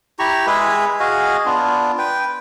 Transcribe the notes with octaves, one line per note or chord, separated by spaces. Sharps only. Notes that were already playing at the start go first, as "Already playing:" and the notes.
E4 G4 A#5 C#6
G#3 G#4 B4 E5
F#4 G#4 D#5 F5
B3 D4 F4
B4 G5